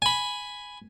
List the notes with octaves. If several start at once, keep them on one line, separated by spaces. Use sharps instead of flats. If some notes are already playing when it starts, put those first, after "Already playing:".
G#5 B5